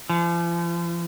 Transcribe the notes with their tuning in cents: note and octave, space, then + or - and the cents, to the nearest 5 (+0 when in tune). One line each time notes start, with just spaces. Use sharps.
F3 -40